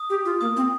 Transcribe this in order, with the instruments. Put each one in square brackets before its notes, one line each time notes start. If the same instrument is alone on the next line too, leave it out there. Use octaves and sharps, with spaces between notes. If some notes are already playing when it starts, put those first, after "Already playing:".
Already playing: [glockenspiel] D#6
[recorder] G4
F4
[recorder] A#3 [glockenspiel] D#6
[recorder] C4